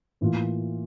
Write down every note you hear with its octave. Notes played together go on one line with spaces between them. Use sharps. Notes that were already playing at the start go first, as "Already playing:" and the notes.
A2 E3 A#3 F4